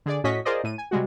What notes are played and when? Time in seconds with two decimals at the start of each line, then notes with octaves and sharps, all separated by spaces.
0.06 D3 G#4 D5
0.24 A2 C#4 F#4 D#5 C#6 B6
0.45 F4 G#4 A#4 C5 D5 D#5
0.64 A2 D#7
0.78 G#5
0.91 C3 G3 G#3 F#4